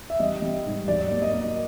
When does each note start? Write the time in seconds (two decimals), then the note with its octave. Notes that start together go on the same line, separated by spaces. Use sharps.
0.10 E5
0.20 G3 D#5
0.42 G3
0.66 G#2
0.88 F#3 D5
1.11 A#3
1.22 D#5
1.34 A#3